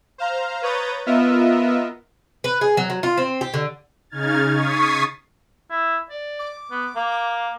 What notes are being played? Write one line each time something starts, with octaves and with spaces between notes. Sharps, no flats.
C5 F5 A#5
B4 C#5 A#5 D#6 G6 A6
B3 F4 A#4 D#5 E5
B4
G#4
F#3
F#3
F4
C4
G4
D3
C#3 D#4 F6 G#6 A6
C#6 D#6 G#6 A6 B6 C7
E4
D5
D6
B3
A#3